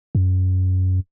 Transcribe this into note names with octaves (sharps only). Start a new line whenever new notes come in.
F#2